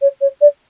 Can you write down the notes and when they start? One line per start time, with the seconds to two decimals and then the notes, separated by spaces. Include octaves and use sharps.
0.01 C#5
0.21 C#5
0.41 D5